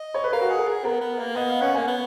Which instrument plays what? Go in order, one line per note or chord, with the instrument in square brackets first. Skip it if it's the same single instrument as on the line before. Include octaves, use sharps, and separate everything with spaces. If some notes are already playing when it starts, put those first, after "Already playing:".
Already playing: [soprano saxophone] D#5
[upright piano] C#5
B4
[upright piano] A#4 [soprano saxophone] F5
[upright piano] F#4
[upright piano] G#4 [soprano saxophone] F#5
[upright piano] A#4
[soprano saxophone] G#4
[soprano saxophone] B3 [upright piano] A#4
[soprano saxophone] B3
A#3
[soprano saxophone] B3 [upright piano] D#5
[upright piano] F5
[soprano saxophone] C#4 [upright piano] F#5
[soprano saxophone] A#3 [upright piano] G#5
[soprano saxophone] B3